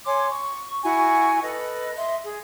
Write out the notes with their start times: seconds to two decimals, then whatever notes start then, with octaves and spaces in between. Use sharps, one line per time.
0.05 C#5 G#5 C6 D6
0.30 C#6
0.83 E4 F#4 G#5 C#6
1.42 A4 B4 D#5
1.96 D#5 E5 C6
2.25 G#4